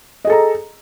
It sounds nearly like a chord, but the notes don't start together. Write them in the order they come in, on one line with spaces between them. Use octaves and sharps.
D#5 G#4 A4 A#5